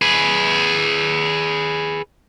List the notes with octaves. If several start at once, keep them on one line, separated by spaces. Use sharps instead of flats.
G#4 B4